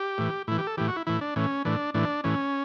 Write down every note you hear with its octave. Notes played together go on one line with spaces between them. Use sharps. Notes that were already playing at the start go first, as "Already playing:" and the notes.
Already playing: G4
A2 E3
A2 E3 E4
G4
A4
A2 E3 G4
F#4
E4
A2 E3 E4
D4
A2 E3 C#4
A2 E3 D4
A2 E3 D4
A2 E3 C#4